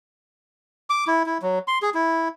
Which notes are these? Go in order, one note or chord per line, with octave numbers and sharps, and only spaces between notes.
D6
E4
E4
F#3
C6
G#4
E4